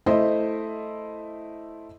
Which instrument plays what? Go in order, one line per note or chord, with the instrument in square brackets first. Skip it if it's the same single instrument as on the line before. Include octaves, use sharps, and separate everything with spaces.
[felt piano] A3 E4 C5 D#5